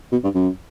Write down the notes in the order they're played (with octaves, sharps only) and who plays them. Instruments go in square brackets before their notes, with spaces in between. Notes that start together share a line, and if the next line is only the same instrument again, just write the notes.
[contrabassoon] B2
G2
F#2